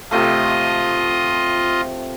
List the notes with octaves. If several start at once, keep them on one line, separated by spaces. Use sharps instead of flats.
C3 F3 A3 F4 D#5